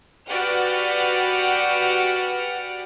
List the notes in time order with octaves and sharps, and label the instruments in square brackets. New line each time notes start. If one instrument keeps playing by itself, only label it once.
[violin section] F#4 G4 B4 D5 F#5 F6